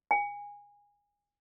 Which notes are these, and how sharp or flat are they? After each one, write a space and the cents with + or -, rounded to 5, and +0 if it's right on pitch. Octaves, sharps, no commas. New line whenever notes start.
G#5 -20